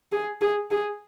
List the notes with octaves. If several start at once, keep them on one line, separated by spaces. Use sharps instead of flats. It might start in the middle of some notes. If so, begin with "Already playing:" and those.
G#4
G#4
G#4